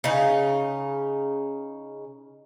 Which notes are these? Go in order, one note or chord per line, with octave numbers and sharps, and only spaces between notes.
C#3 D#4